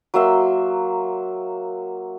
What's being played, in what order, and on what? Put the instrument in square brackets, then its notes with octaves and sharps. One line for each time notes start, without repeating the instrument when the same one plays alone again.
[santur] F#3 A#3 E5 C6